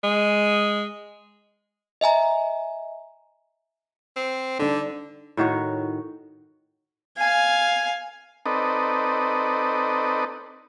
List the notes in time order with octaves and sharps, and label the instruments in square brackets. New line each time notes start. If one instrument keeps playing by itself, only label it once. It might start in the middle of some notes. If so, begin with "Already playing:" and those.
[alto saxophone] G#3
[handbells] D#5 E5 G#5 A#5
[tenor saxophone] C4
[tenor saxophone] D3 [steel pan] D4 D#4
[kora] A2 D#3 F#4 C#5
[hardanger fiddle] F5 G#5
[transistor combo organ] C4 D#4 A4 B4 D5 D#5